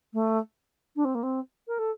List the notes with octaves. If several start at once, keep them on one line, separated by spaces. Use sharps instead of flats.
A3
D4
C4
A#3
C4
A#4
A4